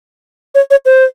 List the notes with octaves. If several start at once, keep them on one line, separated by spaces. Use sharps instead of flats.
C#5
C#5
C5